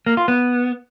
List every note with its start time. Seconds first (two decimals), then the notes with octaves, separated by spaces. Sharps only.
0.06 A#3
0.17 F4
0.28 B3